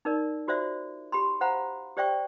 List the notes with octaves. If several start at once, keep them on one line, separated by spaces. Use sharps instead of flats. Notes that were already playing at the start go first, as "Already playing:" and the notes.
D#4 A#4 D5
F4 F#4 C5 D5 E5
G4 B5 C6
C5 F5 F#5 A#5 B5
G4 C5 D5 E5 G5 C#6